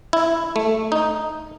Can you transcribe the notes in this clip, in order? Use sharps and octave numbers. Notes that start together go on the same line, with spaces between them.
E4
A3
D#4